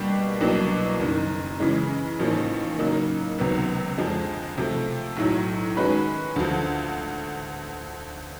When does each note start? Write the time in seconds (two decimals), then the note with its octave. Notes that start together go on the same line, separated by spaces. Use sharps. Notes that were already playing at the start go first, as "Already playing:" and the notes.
Already playing: B2 G3 A#3 D4 G4
0.41 C2 B2 F#3 A#3 D4
1.00 F#1 F#2 D#3
1.60 C#3 E3 G#3
2.19 A1 G#2 F3 A#3 C#4
2.79 C#3 F#3 A#3 D#4
3.38 C#2 C3 D#3 F#3 B3
3.98 F2 D3 F3 G#3
4.57 C3 F3 A3
5.17 B1 A2 F#3
5.77 D#3 G#3 C#4 F#4 B4
6.36 D2 D3 F3